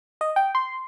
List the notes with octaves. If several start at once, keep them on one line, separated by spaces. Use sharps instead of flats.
D#5
G5
C6